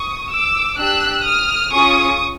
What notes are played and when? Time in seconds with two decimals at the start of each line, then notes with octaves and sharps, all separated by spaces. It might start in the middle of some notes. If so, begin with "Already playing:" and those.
Already playing: C#6 D#6
0.32 D6 E6
0.78 D4 G4 E6 F#6
1.25 D#6 F6
1.71 C#4 F4 G#4 C#6 D#6